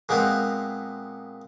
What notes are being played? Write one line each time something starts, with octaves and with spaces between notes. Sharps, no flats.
A#2 G#3 B3 C4 A#4